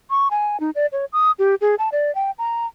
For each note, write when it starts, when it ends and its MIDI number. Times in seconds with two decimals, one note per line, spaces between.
0.10 0.28 85
0.31 0.60 80
0.60 0.70 63
0.75 0.86 74
0.92 1.05 73
1.13 1.32 87
1.39 1.55 67
1.61 1.75 68
1.79 1.89 81
1.92 2.13 74
2.15 2.31 79
2.38 2.66 82